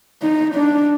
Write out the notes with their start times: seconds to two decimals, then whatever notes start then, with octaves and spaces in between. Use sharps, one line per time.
0.22 D#4
0.55 D4